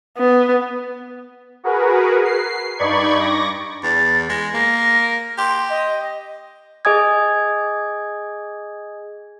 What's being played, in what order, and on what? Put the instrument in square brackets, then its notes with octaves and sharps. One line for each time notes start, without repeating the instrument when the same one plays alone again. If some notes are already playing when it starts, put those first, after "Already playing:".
[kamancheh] B3
[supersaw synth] F#4 G#4 A#4 B4
C7
G2 D#4 D5 B5 C#6 G#6
C#6 D6 A#6
[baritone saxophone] E2 [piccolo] A6
[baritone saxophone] G#3 [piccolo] A#6
[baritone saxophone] A#3 [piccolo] A#6
[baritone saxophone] G4 [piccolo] C6
[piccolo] D#5
[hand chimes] G#4 D#5 G#5 D#6 G#6